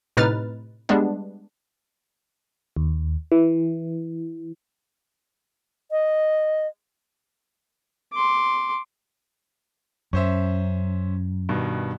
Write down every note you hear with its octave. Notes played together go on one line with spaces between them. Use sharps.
A2 C3 D#4 B4 F6 A6
G3 G#3 B3 D4
D#2
E3
D#5
C6 D6
F#2 C#4 C5 E5
G2 B2 D#3